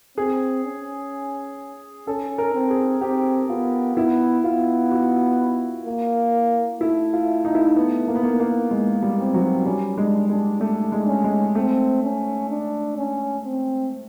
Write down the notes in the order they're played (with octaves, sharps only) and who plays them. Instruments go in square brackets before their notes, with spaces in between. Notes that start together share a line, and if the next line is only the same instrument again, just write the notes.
[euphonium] C4 [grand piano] G#4
[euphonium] C#4
[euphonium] C#4 [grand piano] A4
[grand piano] A#4
[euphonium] C4
[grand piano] G#4
[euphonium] C4 [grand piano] G4
[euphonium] B3 [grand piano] F4
[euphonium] B3 [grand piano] E4
[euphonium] B3 [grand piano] F4
[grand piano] F#4
[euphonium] A#3
[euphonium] A3 [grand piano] E4
[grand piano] F4
D#4
E4
D#4
B3
A#3
B3
A#3
A#3
[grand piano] G#3 [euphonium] A#3
[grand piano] G3
[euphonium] C4
[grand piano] F#3
[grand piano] G3 [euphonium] C#4
[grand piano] G#3 [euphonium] D4
[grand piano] G#3 [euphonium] D4
[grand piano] A3 [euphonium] D4
[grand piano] G#3
[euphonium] C#4
[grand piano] G#3
[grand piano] A3 [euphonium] C4
[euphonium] C#4
D4
C#4
C4